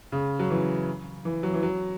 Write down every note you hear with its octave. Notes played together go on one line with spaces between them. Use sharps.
C#3
F#3
E3
E3
F#3
E3
F#3